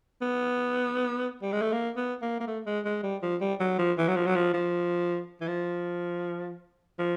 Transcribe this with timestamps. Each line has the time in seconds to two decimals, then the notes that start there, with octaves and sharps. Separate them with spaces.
0.22 B3
1.42 G3
1.52 G#3
1.62 A3
1.72 A#3
1.97 B3
2.22 A#3
2.40 A#3
2.47 A3
2.67 G#3
2.85 G#3
3.04 G3
3.23 F3
3.41 G3
3.60 F#3
3.79 F3
3.98 E3
4.08 F#3
4.16 F3
4.27 F#3
4.36 F3
4.54 F3
5.41 E3
5.48 F3
6.99 F3